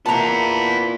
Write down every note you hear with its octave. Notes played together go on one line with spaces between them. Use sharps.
A#2 B3 E4 A5 A#5